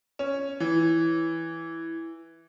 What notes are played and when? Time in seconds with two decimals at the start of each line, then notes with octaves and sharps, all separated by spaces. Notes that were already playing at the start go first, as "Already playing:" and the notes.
0.19 C#4
0.60 E3